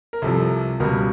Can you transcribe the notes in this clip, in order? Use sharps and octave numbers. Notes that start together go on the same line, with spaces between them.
A#4
C2 C3 F3 A4
C#2 B2 G3 A#4